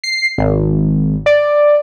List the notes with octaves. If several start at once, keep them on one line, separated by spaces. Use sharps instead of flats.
C7
G#1
D5